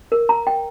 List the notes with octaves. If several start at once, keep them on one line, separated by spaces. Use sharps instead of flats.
A#4
A#5
G5